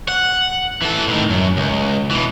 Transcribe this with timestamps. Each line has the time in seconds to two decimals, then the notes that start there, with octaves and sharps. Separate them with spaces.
0.08 F#5
0.82 E3 A4
1.07 A2 D#3
1.30 F#2
1.57 C#2
2.11 B2 E3